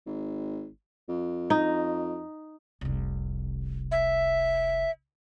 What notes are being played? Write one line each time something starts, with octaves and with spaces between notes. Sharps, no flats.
G#1
F2
D#4
F1 C2
E5